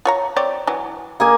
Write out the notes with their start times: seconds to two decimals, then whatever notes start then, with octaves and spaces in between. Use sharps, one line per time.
0.05 F4 C#5 A#5
0.36 C4 C#5 D5
0.67 E3 F#3
1.20 A#3 G#4 G#5